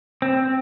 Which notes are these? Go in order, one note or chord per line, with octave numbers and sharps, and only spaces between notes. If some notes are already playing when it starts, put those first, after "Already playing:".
C4